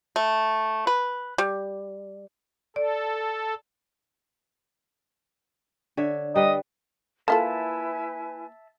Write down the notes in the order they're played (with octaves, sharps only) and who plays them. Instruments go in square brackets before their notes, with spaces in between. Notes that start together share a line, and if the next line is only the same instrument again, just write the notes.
[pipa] A3
B4
G3
[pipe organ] A4 [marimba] D5
[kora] D3 C#5 E5
[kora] G3 B4 [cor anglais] D#5
[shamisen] A#3 F4 A4 [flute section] E4 B4 G#5 [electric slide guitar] E5 A5